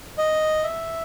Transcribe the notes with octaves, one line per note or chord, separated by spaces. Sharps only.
D#5
E5